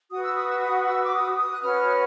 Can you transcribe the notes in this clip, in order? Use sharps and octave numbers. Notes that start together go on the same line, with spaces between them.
F#4 B4 D#6
E6
D#6
E6
D#6
D#6
E6
D6
D#6
E6
D#6
F#6
C#4 F#4 B4 F6